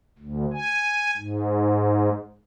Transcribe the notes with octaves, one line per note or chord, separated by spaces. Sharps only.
D2
G#5
G#2